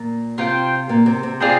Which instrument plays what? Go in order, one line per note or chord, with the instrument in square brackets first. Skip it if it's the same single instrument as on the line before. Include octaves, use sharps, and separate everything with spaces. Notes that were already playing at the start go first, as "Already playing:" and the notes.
Already playing: [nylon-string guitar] A#2
[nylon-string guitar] C3 [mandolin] F4 C5 G5
[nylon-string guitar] A#2
C3
C3
[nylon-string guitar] C3 [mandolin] C4 F4 G#4 D5